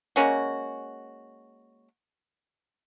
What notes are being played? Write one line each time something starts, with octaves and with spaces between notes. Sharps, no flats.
G#3 A#3 C#4 F#4